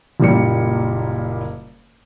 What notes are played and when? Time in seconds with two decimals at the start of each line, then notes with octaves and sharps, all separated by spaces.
0.20 F#1 A#2 G3 C#7